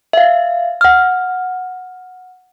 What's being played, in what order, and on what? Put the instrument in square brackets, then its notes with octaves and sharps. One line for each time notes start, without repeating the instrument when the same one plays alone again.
[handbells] E5 F5
F#5 F6